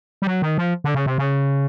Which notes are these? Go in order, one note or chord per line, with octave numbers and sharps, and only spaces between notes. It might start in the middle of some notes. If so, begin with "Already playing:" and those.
G3
F#3
D#3
F3
D3
C#3
C3
C#3